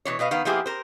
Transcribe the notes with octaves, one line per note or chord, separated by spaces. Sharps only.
B2 E3 C#5
B2 B4 D#5 F5
D#3 B3 F5
F3 A#3 B3 E4 G4 G#4
A#4 C5